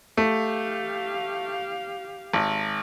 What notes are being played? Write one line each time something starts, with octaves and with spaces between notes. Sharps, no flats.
A3 G4 F5
G#1